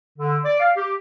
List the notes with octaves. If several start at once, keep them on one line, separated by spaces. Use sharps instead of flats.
D3
D5
F5
G4